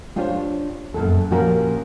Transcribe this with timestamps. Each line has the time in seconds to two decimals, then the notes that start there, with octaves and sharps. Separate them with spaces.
0.16 D4 F4 G4 C5 C#5
0.94 F#2 A#2 B3 A4
1.31 A#2 F3 C#4 F#4 G4 A#4